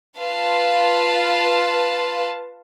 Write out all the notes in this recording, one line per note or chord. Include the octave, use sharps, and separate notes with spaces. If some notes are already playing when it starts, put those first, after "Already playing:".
F4 B4 F5 A5